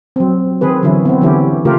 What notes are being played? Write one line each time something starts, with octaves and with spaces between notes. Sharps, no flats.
F#3 C4
D#3 C4 G#4 B4
D3 E3 F#3 C#4 E4
B3 C4
D3 E3 B3 C#4 E4 G4
C#3 A3 F4 G4 A#4